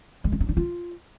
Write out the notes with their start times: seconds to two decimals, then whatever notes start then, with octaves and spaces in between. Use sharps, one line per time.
0.24 G#3
0.32 C#4
0.40 D#4
0.49 D4
0.57 F4